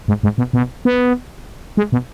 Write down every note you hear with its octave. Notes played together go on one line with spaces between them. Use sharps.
G#2
G#2
B2
B2
B3
G#3
B2